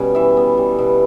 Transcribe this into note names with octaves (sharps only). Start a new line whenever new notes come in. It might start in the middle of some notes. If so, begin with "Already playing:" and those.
Already playing: B2 G3 C#4
E3 E5
B3
G3
B2